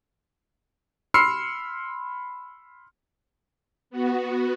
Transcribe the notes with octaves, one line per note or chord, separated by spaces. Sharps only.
B5 C6 E6 F6 C7 C#7
B3 F#4